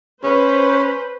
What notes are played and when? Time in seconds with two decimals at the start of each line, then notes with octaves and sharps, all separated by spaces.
0.24 C#4 B4 C5